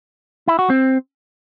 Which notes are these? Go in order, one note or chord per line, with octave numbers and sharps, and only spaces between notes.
E4
F#4
C4